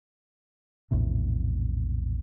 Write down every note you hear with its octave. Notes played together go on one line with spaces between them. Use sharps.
A#1 E2 A2 C3